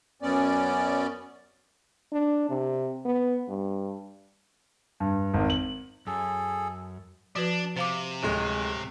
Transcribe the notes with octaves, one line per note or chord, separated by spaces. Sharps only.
F#2 B3 C#4 D5
D4
C3
B3
G2
G2
G#1
F#7
F#2 G#4 A4
F3 D4 F#4 B4
C3 C5 F5 D6
D1 G#3